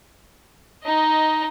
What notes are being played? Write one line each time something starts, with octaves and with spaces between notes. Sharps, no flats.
D#4 D#5